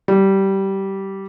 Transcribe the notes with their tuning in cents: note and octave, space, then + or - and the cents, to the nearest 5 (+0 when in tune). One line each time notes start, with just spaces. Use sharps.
G3 -15